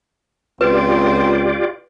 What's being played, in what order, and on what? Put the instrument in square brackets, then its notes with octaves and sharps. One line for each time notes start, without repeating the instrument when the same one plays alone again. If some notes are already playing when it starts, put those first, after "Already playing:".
[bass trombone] C#2 [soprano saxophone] C4 [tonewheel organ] F4 G4 D5 [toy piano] B4